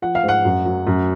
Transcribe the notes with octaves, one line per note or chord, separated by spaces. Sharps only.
F3 F#5
F5
G#2 F#5
F#2
F#3
F#2